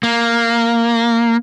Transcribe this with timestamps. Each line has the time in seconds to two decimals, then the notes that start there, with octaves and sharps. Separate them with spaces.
0.03 A#3